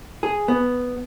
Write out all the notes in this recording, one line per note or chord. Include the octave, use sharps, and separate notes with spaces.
G#4
B3